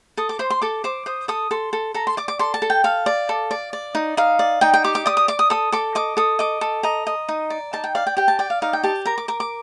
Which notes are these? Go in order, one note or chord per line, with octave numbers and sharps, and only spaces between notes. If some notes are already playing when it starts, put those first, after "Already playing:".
A4 D#6
D6
C5 C6
C6
A4 D6
C5 D6
C5 D#6
A4 D#6
A4 C6
A4
A4 A#5
C6
D5 D6
D6
A4 C6
A5
A4
G5
A4 F5
D5
A4
D5
D5
D#4
D#4 F5
D5
D#4 G5
G5
G4 D6
D6
D5 D#6
D#6
D5 D6
D#6
A4 D#6
A4 D6
D#5 D6
A4 D#6
D#5 D6
A4
D#5 A#5
D#5
D#4
D5
D#4 A5
G5
D5 F5
G5
G4 G5
A5
D5 G5
F5
D#4 F5
G5
G4 A5
A#4 A#5
D6
A#4 D6
D6